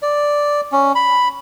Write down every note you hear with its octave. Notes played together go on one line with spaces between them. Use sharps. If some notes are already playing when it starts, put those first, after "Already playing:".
D5
C#4
B5